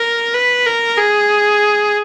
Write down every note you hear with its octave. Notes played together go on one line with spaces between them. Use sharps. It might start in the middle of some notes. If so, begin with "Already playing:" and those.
Already playing: A#4
B4
A#4
G#4